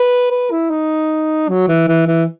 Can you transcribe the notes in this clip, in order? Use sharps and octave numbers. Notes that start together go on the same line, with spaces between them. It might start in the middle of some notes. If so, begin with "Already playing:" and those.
Already playing: B4
B4
E4
D#4
F#3
E3
E3
E3